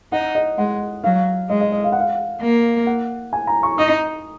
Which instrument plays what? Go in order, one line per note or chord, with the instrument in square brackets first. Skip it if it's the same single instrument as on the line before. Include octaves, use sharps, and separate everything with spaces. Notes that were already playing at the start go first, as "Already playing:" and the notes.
[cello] D#4 [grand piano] F#5
[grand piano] D#5
[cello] G#3 [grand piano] F#5
[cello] F#3 [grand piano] F5
[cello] G#3 [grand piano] D#5
[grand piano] D#5
D#5
F5
F#5
F5
[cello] A#3
[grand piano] F#5
G#5
A#5
C#6
[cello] D#4 [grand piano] D#6